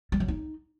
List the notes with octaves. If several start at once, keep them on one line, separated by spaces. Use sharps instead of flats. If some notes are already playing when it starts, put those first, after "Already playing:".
G3
F#3
D#4